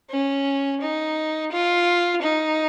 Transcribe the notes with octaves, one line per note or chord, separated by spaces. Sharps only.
C#4
D#4
F4
D#4